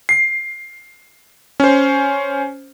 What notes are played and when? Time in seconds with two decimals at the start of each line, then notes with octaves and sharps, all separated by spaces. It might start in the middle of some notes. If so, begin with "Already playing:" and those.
0.09 C7
1.60 C#4 C5